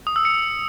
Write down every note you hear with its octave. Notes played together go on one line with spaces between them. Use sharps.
D#6
E6
C#7